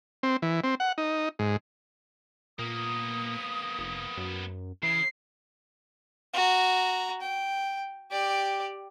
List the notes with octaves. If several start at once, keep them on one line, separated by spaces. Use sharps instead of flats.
C4
E3
C4
F#5
D#4
G#2
A#2 A#3 B3 D#6
F1
F#2
C#3 E3 C7
F#4 A#5
G5
G4 D5